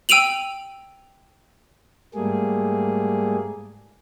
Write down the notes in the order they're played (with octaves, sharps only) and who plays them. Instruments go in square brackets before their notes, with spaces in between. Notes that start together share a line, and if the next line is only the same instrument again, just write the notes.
[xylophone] G5 E6 D7 D#7 F7 F#7
[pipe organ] G#2 G3 A3 A#3 G#4